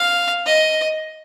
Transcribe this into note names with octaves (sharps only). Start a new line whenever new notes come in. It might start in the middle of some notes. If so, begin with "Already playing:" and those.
Already playing: F5
D#5